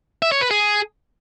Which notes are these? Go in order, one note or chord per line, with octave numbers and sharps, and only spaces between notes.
E5
C#5
B4
G#4